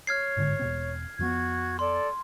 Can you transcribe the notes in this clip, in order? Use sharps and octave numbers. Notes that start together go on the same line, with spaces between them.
C#5 F6 G#6 C7
G1 G#2 D3
E1 B2 C4
F2 F3 B3 F#4 G#6
A4 D5 C6